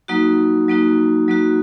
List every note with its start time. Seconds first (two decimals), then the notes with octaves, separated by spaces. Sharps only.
0.08 F#3 A#3 D#4 F#4
0.68 F#3 A#3 D#4 F#4
1.28 F#3 A#3 D#4 F#4